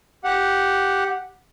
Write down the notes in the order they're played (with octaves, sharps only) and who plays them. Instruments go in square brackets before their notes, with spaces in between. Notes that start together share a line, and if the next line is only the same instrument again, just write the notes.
[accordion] G4 F#5